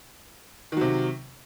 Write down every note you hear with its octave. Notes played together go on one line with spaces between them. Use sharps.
C3 D#3 F#3